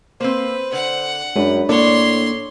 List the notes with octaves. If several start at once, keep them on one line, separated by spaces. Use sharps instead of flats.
A#3 C4 B4 C5
D3 F#5
F#2 G#3 D4 B4
A2 A#3 D4 A4 C#5 D5 C6